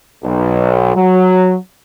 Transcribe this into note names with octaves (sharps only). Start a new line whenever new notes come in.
B1
F#3